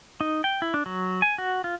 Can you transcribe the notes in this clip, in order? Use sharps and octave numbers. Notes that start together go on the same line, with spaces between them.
D#4
G5
E4
D4
F#3
G#5
F#4
F4